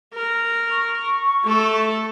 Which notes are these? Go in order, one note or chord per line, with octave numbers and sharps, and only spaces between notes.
A#4
C#6
A3 A4